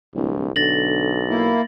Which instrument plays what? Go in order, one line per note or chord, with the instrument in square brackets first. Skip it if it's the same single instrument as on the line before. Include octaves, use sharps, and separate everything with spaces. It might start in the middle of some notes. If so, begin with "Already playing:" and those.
[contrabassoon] D1 [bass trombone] C2
[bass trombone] B1 [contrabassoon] D3 [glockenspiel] A6 A#6 F#7
[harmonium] A#3 E4